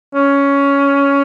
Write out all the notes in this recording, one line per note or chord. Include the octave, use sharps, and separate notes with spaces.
C#4